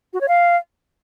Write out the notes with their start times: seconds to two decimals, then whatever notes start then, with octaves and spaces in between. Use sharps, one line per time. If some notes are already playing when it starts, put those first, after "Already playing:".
0.13 F#4
0.21 C#5
0.28 F5